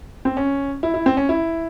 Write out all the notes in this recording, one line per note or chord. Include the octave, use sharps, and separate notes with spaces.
C4
C#4
E4
E4
C4
C#4
E4